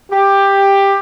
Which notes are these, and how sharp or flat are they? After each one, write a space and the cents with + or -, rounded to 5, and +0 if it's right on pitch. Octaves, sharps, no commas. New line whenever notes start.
G4 +10